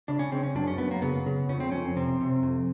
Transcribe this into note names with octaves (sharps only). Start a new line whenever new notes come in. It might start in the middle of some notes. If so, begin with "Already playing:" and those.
C#3 D4
C#4
C#3 C4
C#4
F#2 D4
C#4
F#2 B3
A#3
C#3 B3
C#3
F2 C#4
C4
F2 C#4
C3 C4
C3
F2